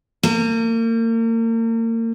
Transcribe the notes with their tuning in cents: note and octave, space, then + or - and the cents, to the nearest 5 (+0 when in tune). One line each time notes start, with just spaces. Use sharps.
A#3 -35